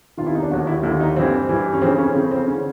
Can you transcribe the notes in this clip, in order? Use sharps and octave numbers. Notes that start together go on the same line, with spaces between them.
E2 C3 D#3 F4
E4
D#4
D4
D#2 D3 F#4
E4
D#2 D3 E4
D#4
G2 E3 C4
G2 E3
C#4
F2 C#3 E3 C4
C#4
F2 C#3 E3 C4
C4
D3 C#4